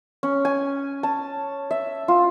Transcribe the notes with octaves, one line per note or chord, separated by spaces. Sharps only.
C#4
G#5
A5
E5
F4